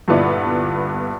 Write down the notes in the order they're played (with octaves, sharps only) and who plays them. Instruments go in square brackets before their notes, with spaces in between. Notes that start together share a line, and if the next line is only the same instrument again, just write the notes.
[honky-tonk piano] G2 A#2 D3 B3 E4 D5